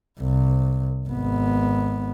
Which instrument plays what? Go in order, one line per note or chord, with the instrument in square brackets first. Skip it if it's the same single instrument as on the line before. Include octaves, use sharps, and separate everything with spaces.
[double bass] C2
G#1 B3